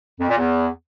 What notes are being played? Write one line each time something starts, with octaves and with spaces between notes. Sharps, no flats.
F2
A#2
E2